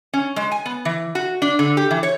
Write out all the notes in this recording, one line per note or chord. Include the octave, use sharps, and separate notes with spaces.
C#4
G#3
G#5
B3
E3
F#4
D4
D3
G4
E3
C#5